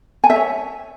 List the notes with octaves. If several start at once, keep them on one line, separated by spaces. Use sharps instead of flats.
G#5
E5
C#5